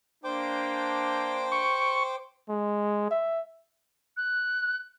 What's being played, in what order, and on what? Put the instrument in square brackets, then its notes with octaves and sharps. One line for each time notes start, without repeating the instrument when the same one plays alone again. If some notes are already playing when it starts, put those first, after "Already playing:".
[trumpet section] A#3 D4 [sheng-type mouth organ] C5 G5 D6
[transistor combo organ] C#6
[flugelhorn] G#3
E5
[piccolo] F#6